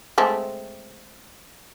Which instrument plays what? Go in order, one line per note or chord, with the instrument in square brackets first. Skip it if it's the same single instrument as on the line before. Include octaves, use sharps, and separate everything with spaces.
[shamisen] G#3 A3 C4